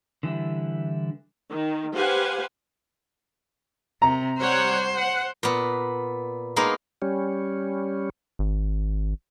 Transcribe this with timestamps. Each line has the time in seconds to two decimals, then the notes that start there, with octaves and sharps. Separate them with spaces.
0.23 D3 E3 G3 E4
1.51 D#3
1.96 G4 B4 C5 F5 F#5 G#5
4.02 C3 A#5
4.39 G3 C5 C#5 F#5
4.96 F#5
5.43 A#2 B3
6.56 G#3 A#3 B3 D#4
7.02 G3 C#4
8.39 G#1